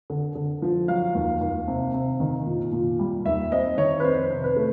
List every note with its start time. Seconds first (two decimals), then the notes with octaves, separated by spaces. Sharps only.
0.10 D3
0.35 D3
0.62 F3
0.88 F#3 F5
1.15 D#2
1.41 D#2
1.68 C3
1.94 C3
2.20 D#3
2.46 A#2
2.72 A#2
2.99 G3
3.25 D#2 E5
3.52 C4 D#5
3.78 D#3 C#5
4.00 B4
4.04 F2 C5
4.30 C3
4.44 B4
4.57 A3